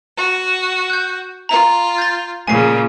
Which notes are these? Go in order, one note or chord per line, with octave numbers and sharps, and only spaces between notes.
F#4
F#6 G6
F4 A#5
G6 A6
A#2 C#3 G#5 C7